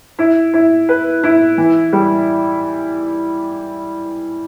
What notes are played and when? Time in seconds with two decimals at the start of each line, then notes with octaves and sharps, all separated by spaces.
0.19 E4
0.54 E4
0.89 B4
1.23 E4
1.58 E3
1.93 G3